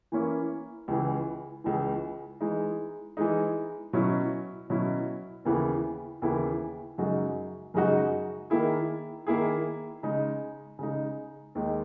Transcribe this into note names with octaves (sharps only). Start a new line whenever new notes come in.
E3 A#3 C#4 E4
C#2 C#3 E3
C#2 C#3 E3
E3 G#3 D#4
E3 G#3 D#4
B2 F#3 C#4 E4
B2 F#3 C#4 E4
D#2 C#3 E3 B3 E4
D#2 C#3 E3 B3 E4
F#2 C#3 G#3 D#4 F#4
F#2 C#3 G#3 D#4 F#4
D#3 A#3 E4 G#4
D#3 A#3 E4 G#4
C#3 G#3 D#4
C#3 G#3 D#4
D#2 D#3 G#3 D#4